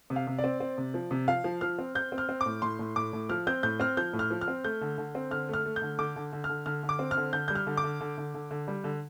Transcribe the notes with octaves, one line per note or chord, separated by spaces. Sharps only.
C3
F5
C3
D5
C4
C4
C3
F3
C3
F3 F5
F3
F3 F6
C4
C4 G6
C4
F6
C4
D6
A2
A2 C6
A2
A2 D6
A2
F3 F6
C4 G6
A2 G6
C4 F6
F3 G6
A2
F6
F3
F6
C4
A3 G6
D3
D3
C4
D3 F6
A3 F6
A3
G6
D3
D3 D6
D3
D3
F6
D3
D3 F6
D3
D6
C4
F6
D3
D3 G6
G3 G6
F6
D3
D6
D3
D3
D3
D3
D3
G3
D3